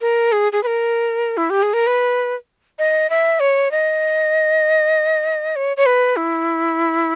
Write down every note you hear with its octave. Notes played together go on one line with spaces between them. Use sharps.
A#4
G#4
G#4
B4
A#4
E4
G4
G#4
A#4
B4
D#5
E5
C#5
D#5
C#5
C#5
B4
E4